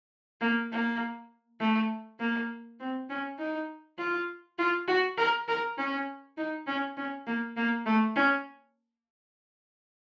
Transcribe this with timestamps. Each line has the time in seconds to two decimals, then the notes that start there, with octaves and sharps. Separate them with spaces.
0.41 A#3
0.72 A#3
1.60 A3
2.20 A#3
2.80 C4
3.10 C#4
3.39 D#4
3.98 F4
4.58 F4
4.88 F#4
5.18 A#4
5.48 A#4
5.78 C#4
6.37 D#4
6.67 C#4
6.97 C#4
7.27 A#3
7.57 A#3
7.86 A3
8.16 C#4